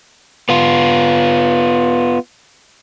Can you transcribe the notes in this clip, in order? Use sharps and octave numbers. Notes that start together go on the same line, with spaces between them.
B3 F4